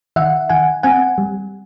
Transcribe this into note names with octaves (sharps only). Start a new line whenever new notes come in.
D#3 E5 F#5
D#3 F#5 G#5
C4 F#5 G#5
G3